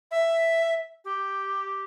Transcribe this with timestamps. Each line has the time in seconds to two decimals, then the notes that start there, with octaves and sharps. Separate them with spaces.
0.11 E5
1.05 G4